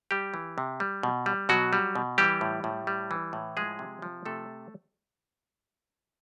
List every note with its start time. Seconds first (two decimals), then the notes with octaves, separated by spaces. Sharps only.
0.11 G3 G4
0.34 E3
0.58 C3
0.80 G3
1.03 B2
1.26 G3
1.49 B2 F#3 F#4
1.73 G3
1.95 B2
2.18 E3 G3 G4
2.41 A2
2.64 A2
2.87 G3
3.11 E3
3.33 A2
3.57 F3 G#3 G#4
3.79 C3
4.02 F3
4.25 C3 A3 A4